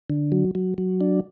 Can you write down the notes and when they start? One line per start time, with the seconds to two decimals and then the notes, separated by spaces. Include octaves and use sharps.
0.10 D3
0.32 F#3
0.55 F#3
0.78 F#3
1.01 D4